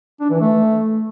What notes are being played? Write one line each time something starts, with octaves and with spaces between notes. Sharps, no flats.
D4
E3
A3